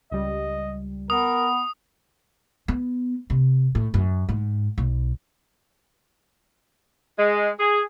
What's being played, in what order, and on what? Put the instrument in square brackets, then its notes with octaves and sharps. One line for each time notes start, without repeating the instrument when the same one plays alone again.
[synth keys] C#2 G3 [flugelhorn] D#5
[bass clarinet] B3 [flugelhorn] A#4 [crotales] D#6
[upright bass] B3
C3
A2
F#2
G#2
B1
[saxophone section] G#3
G#4